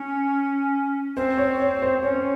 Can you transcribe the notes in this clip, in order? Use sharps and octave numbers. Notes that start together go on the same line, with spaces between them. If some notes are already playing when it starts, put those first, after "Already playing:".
Already playing: C#4
C4 C5
C#5
C#5
C5
C#4 C#5